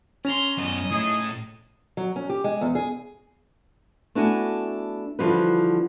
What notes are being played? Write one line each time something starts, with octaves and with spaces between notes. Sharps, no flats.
C#4 A#5 C6
F#2 B3 D#5
A2 D#4 E4 G#4
F#3
C#4
G4
G#3
E2
G#4
A3 B3 D4 E4 F#4 G#5
D3 E3 F3 G3 F#4 B4